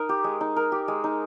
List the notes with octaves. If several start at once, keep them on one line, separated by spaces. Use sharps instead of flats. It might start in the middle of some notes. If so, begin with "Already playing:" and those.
Already playing: D#4 A#4
G4
G#3
D#4
A#4
G4
G#3
D#4